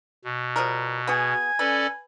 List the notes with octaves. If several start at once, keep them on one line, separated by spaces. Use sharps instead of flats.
B2
F3 G3 A#4
B3 F#4 G#4 G#5
C#4 A4 B4 D5